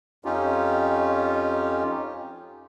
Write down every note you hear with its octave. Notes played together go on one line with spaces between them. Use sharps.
F2 C#4 D#4 F4 G4